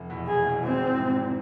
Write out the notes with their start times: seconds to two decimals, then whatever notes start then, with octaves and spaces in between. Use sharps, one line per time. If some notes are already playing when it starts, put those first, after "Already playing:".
Already playing: F1
0.10 E2 B2
0.27 F1 G#4
0.46 E2 B2
0.63 G#1 C4
0.82 G#2 E3
0.99 G#1
1.17 E3